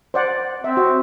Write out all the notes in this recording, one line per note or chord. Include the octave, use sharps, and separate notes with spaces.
C5 D5 F#5
C4 E5
F#4